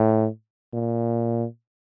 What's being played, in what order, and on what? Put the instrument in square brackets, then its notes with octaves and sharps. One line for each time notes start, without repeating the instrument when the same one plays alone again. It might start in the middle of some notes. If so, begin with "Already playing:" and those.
Already playing: [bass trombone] A2
A#2